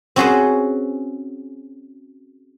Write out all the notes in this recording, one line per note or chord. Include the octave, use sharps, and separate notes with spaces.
C4 C#4 F#4 G#4 B4 C5